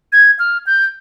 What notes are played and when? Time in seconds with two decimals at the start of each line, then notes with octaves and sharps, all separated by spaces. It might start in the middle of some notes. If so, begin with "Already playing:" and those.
0.13 G#6
0.39 F6
0.67 G6